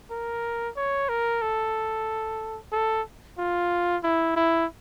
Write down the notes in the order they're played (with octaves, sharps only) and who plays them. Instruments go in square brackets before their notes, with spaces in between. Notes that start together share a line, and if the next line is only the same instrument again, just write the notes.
[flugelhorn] A#4
C#5
A#4
A4
A4
F4
E4
E4